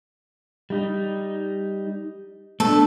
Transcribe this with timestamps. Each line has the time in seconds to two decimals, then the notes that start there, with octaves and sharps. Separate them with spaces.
0.70 G3 D#4
2.60 A3 B3 D4 A4